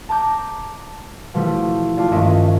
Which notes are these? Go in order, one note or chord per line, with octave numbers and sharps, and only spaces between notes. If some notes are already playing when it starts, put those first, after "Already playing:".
A5 A#5 D6 G6
B2 E3 F3 G3 A3
A3 D4 F4 D5
G#1 G2 C#4 D#5 E5 D7